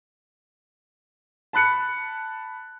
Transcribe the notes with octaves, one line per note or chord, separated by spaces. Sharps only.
A5 B5 F#6 C#7